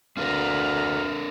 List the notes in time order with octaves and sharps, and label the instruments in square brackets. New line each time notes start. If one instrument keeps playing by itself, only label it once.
[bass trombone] D2 [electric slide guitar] C4 D4 A#4 [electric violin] B4 A#5 [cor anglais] F5